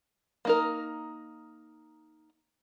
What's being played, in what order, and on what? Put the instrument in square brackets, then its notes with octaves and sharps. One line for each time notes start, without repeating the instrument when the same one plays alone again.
[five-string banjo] A#3 D#4 A#4